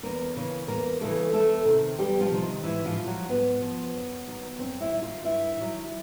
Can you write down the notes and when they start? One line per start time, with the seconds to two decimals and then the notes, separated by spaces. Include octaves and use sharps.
0.03 E2 A#3 A#4
0.36 C#3 E3
0.68 E2 A#3 A#4
1.01 C#3 E3 A3 A4
1.33 E2 A3 A4
1.65 C3 D#3
1.98 E2 G3 G4
2.20 F3 F4
2.31 C3 D#3
2.63 G#2 E3 E4
2.85 F3 F4
2.97 F3
3.06 F#3 F#4
3.29 G#2 B3 B4
3.61 F3
3.94 F#2
4.26 D#3 F#3
4.58 F#2 C4 C5
4.80 E4 E5
4.91 D#3 F#3 E5
5.02 F4 F5
5.24 G2 E4 E5
5.56 D#3 F#3